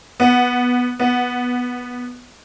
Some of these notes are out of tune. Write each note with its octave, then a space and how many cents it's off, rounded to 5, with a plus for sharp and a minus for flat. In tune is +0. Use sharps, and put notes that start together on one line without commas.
B3 -5
B3 -5